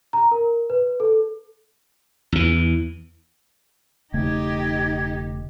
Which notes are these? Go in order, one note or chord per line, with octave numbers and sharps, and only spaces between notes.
A#5
A#4
B4
A4
E2 E3
E1 C#3 A3 D#4 G4 G#6